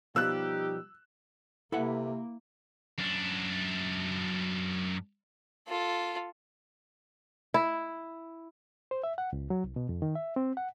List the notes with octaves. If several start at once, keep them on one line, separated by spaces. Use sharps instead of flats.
B2 F3 G3 D#4 G4 E6 F#6
C3 A#3 E4 A4 B4 F#5
F#2 D4
F4 A4
E4
C5
E5
F#5
C#2
F#3
C2
B2
F2
D#3
E5
C4
F#5